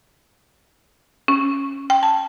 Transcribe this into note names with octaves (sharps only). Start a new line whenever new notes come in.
C#4
G5
A5